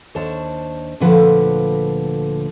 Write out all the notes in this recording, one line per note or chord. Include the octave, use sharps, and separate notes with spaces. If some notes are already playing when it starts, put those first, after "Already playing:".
D#2 D4 C5 C#5 A5
D2 A#2 D3 F3 B4 F#5